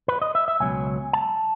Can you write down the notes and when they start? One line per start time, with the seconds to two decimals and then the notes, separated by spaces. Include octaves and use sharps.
0.08 B4
0.22 D#5
0.35 E5
0.48 E5
0.60 C#2 B2 F#3 G#5
1.13 A5